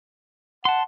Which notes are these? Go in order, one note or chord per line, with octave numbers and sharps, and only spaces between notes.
F#5 A5 C6